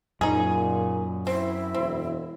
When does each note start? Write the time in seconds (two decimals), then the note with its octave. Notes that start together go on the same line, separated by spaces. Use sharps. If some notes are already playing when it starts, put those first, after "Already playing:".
0.21 F#2 A#2 D#4 G#4
1.27 C4 E4
1.74 E1 C4